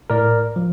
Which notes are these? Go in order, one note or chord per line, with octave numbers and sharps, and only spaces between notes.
A2 A#4 D5
F3